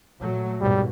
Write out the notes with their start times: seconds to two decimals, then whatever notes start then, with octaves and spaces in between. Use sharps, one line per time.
0.19 A#2 F#3 A3
0.61 D#2 G#2 B2 G3